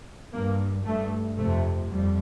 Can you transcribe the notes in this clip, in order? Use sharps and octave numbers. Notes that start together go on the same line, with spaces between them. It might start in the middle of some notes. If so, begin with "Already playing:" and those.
G2 A#3
G2 A3
F2 C3 A3
F2 G3